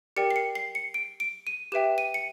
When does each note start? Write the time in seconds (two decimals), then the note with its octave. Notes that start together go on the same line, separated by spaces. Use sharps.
0.16 G4 A#4 D5 G5 C#7
0.31 C7
0.36 C#7
0.55 C7
0.75 C#7
0.94 D7
1.20 D7
1.47 D#7
1.72 G4 B4 E5 G5 E7
1.98 D#7
2.14 C#7